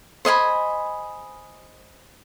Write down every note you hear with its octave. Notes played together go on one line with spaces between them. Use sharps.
C5 D#5 G#5 B5